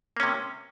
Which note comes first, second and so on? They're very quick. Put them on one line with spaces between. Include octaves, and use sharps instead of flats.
A#3 C#4 C3